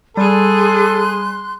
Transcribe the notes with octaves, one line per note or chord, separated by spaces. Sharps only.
G3 G#4 A4 C6 F#6